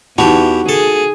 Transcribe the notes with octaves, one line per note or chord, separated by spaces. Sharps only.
E2 E3 D#4 F#4 G4 A5
G#4 A4